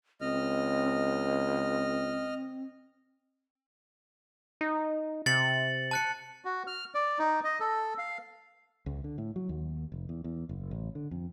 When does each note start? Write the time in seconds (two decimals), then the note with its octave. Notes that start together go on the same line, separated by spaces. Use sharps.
0.21 C#2 C4 D#5 F6
4.61 D#4
5.26 C3 A6 C#7 F#7
5.91 A5 F#6 C#7
6.45 F#4
6.67 F6
6.95 D5
7.19 D#4
7.44 D#5
7.60 A4
7.98 F5
8.86 C#2
9.04 D3
9.18 A2
9.36 F#3
9.49 D#2
9.92 F1
10.09 E2
10.24 E2
10.49 F#1
10.71 A1
10.95 D3
11.11 F2